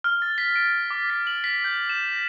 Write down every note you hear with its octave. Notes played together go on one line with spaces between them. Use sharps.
F6
A6
B6
D7
D6
B6
F#7
B6
G6
E7
A#6